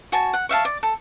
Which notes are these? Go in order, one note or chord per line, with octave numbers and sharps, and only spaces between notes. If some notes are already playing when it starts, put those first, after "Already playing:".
F#4 G#5 A5
F#5
C#5 E5 F5 A5
D5
A4